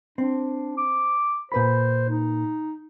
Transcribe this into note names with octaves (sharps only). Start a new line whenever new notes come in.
C4 D4
D6
A#2 B4 C5 B5
D#4